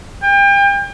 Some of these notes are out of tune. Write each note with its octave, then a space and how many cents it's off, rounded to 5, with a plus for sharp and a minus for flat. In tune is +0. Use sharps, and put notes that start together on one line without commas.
G5 +35